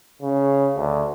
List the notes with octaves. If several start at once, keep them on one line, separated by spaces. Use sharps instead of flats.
C#3
D2